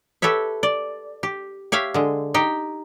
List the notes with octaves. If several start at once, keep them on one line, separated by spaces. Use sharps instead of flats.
G4 A4 B4 C#5 E5
D5
G4
G4 C#5 E5 F5
D3 G#3
D#4 G4 G5